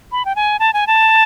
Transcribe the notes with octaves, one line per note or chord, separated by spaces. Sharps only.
B5
G5
G#5
A5
G#5
A5